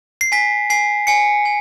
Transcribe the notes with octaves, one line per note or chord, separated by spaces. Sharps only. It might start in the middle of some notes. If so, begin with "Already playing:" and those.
C7
G#5 B6
G#5 C7
G#5 C#7
G#5